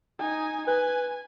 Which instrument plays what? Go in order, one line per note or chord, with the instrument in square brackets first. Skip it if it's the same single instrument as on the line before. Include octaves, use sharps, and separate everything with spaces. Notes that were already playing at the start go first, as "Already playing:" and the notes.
[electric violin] D#4 G#5
[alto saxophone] B4 [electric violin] G#5